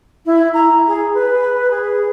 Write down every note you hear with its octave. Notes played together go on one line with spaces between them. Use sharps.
E4
A#5
G#4
B4
G#4